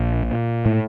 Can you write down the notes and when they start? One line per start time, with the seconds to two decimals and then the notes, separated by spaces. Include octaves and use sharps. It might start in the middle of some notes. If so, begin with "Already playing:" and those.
Already playing: A#1
0.22 A#2
0.66 A2 A3